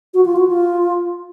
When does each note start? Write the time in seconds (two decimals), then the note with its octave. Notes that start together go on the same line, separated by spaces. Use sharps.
0.14 F#4
0.25 F4
0.36 F#4
0.47 F4